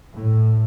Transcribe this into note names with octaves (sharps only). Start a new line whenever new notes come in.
A2